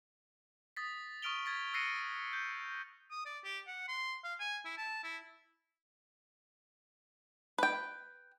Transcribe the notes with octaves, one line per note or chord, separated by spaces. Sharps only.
D#6 A6 B6
C#6 D#6 F6 D7 F7 G7
F6 G#6 A6 B6
E6 F#6 A#6 C7 C#7 D#7
G6
D#6
D5
G4
F#5
C6
F5
G#5
E4
A5
E4
B4 G5